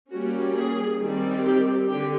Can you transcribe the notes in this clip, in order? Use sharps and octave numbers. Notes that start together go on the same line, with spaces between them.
G3 A#3 C#4 F#4
G#4
D#3 G3 C4
G4
D3 G4